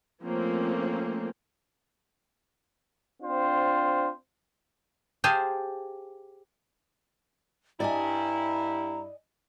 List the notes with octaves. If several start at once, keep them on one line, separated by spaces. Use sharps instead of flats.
F3 A3 A#3 C4 C#4
C4 D4 F4 C5
G4 G#4 C5 F5 G#5 A5
G2 E4 D5 D#5 G#5 A#5